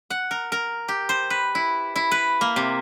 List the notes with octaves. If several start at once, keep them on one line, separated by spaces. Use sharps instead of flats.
F#5
A#4
A#4
G4
C5
B4
E4
E4
B4
A#3
C3